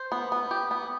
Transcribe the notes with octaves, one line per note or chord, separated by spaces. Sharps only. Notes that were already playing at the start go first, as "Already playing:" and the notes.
Already playing: C5
B3
B3
G4
B3